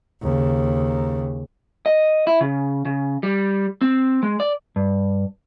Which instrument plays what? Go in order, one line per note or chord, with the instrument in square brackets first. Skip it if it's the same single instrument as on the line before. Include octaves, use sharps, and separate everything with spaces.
[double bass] D#2 C#3
[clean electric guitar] D#5
E4
C#3
C#3
G3
C4
G#3
D5
G2